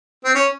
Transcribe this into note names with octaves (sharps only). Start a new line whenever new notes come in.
C4
C#4